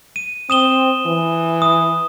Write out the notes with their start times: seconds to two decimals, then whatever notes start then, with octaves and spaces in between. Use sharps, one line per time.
0.16 D#7
0.50 C4 D#6 E7 G7
1.06 E3
1.62 D#6